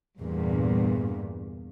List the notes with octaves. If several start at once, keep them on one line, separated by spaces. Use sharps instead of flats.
E2 G2 A#2